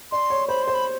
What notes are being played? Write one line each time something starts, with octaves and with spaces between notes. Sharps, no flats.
D5 C6
C#5
C5 B5
C5 C6
B5